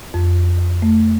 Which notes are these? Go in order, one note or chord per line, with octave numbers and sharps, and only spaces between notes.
F2
A3